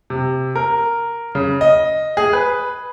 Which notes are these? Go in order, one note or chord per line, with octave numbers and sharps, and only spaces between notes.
C3
A#4
C#3
D#5
G#4
B4